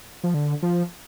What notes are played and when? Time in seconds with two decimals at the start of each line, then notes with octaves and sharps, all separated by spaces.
0.24 F3
0.34 D3
0.63 F3